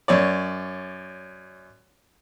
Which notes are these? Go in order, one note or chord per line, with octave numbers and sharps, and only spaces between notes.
F#2 C#5 D5